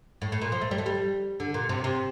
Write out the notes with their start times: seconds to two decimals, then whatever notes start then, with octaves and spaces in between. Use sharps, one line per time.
0.22 A2
0.32 A2
0.42 A#2
0.52 F3
0.61 A3
0.71 G3
0.78 A3
0.86 G3
1.40 D3
1.54 A#2
1.69 C3
1.84 C3